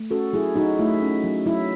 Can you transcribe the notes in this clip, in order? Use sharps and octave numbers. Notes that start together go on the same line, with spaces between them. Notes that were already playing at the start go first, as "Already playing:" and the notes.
Already playing: A3
C#4 F#4 A4
F#3 E4 G#4
F#3 D#4 F#4
A3 E4
C#4
F#3
F#3 E4